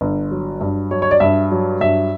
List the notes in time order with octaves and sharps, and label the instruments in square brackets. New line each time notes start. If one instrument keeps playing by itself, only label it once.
[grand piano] G1
F#3
G2
F#3 C#5
C#5
D5
G2 E5
F#3
G2 E5